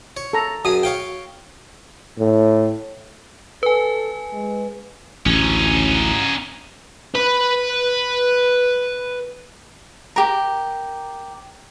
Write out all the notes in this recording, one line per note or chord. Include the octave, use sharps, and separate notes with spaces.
C#5
A4 A#5
F#2 G#4 D#6
C#5 F5 G5
A2
A4 B4 G#5
G#3
A1 D2 C#4 D#4
B4 B5
G4 A#4